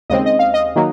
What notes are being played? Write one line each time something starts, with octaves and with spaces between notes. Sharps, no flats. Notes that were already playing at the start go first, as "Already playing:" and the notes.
D#2 C#3 G#3 C4 D#5
D#5
F5
D#5
D#3 F#3 A#3